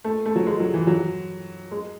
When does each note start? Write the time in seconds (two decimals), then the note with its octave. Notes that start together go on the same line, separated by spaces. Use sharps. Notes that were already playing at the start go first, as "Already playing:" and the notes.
0.04 A3
0.26 A3
0.36 F#3
0.46 G#3
0.60 F#3
0.74 E3
0.87 F#3
1.71 G#3